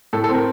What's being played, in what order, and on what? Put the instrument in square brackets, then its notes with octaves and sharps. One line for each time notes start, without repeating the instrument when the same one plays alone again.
[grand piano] A2 A4
A4
C4 A#4